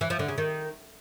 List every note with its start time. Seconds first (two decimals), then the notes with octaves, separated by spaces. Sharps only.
0.01 E3
0.10 F3
0.19 D3
0.28 C#3
0.38 D#3